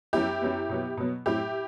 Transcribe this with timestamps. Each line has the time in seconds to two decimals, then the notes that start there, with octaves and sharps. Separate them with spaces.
0.13 F#2 F#3 B3 E4 G4
0.42 F#2 F#3 B3
0.69 B2 F#3 B3
0.97 B2 F#3 B3
1.26 A2 F#3 C4 E4 G4